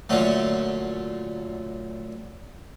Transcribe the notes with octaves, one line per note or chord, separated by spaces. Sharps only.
A#2 D3 F#3 A3